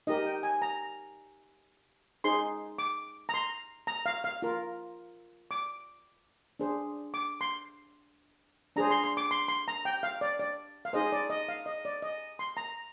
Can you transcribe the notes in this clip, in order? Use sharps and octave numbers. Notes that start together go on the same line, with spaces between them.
D#4 G4 A#4 D#5
G5
G#5
A#5
D#4 G#4 C5 C6
D6
A#5
C6
A#5
F5
F5
F4 A#4
D6
D4 G#4 C5
D6
C6
D4 G#4 C5 A#5
C6
C6
D6
C6
C6
A#5
G5
F5
D5
D5
F5
D#4 G#4 C5 D#5
D5
D#5
F5
D#5
D5
D#5
C6
A#5